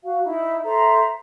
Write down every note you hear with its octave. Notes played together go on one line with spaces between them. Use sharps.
F#4 F5
D#4 E4
A4 C5 E5 A#5